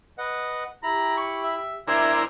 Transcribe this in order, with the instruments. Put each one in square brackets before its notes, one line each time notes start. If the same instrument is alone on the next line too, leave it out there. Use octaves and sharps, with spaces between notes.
[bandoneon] B4 D#5 F#5
[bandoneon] E4 B5 [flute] G4 [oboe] A#5
[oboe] C#6
E5
[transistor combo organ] D4 E4 A#4 [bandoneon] C5 C6 F6 [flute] E5 [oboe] G#5